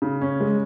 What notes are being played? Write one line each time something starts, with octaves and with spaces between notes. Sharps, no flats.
C#3
C#4
G#3